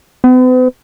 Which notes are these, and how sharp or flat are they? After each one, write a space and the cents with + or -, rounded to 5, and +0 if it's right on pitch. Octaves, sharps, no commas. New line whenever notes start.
B3 +45